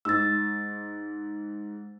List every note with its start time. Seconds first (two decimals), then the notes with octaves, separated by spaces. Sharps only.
0.05 G#2 E6 A6